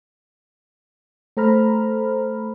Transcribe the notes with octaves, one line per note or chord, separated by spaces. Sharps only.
A3 A4 C5 A#5 B5 F6